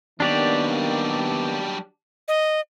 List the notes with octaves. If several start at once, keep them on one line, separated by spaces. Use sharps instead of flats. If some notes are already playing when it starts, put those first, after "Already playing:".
D#3 F#3 G3 A#3 B3 D4 G4 D5
D#5